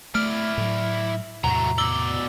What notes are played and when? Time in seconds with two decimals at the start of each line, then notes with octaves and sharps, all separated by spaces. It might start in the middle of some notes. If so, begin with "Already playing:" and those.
0.15 A3 E4 D5 F6
0.58 A2 F#3
1.44 E2 A2 C3 F#3 A3 A#5
1.78 B2 D5 E6 G7